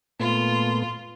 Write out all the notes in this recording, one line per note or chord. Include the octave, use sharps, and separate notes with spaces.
A#2 A3 B3 F4